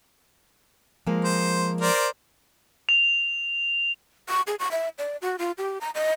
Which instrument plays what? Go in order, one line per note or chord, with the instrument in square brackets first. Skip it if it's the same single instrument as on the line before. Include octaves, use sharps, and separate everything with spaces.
[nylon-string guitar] F3 G#3 A#3
[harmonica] C5
A#4 C5 D5
[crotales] F7
[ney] C#6
G#4
C#6
E5
D5
F#4
F4
G4
A#5
D#5